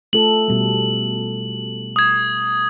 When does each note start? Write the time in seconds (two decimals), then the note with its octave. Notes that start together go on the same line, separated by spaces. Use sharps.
0.13 A3 F4 A4 F#7
0.48 B2 G3
1.96 D#6 G#6